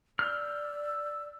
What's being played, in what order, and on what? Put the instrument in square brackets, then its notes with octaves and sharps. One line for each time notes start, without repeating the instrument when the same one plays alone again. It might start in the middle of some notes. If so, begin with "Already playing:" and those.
[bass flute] D5 [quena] E6 [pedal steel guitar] F6 G6